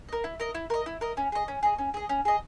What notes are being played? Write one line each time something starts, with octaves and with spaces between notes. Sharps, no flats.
A#4 D#5
E4
A#4 D#5
E4
A#4 D#5
E4
A#4 D#5
C#4
G#4 D#5
C#4
G#4 D#5
C#4
G#4 D#5
C#4
G#4 D#5